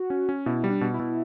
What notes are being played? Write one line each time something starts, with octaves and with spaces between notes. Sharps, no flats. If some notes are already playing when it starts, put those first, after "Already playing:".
Already playing: F#4
C#4
C#4
B2 E4
G3
D4
B2
E4
B2